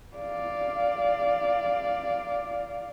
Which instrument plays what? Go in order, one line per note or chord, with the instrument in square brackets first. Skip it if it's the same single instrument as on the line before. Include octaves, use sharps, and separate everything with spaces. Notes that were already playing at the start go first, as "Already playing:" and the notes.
[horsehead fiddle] D5 F5